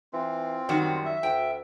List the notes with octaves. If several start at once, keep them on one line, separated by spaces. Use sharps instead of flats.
E3 C4 F4
F#2 D#3 G3 F#4
E5
D2 G5